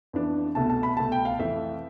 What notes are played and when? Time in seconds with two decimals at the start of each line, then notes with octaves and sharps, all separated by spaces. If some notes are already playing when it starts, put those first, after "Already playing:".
0.13 F2 E3 B3 D4
0.55 C2 B2 A3 A5
0.70 A5
0.83 B5
0.97 C2 B2 A3 A5
1.12 G5
1.25 F5
1.39 F2 E3 A3 E5